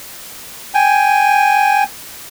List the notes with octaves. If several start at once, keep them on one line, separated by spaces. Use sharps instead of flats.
G5 G#5